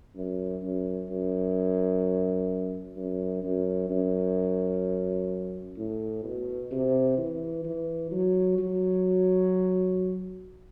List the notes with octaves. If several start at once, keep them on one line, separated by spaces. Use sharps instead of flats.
F#2
F#2
F#2
F#2
F#2
F#2
A2
B2
C3
E3
E3
F#3
F#3